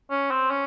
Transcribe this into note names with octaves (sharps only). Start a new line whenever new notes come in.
C#4
C4
C#4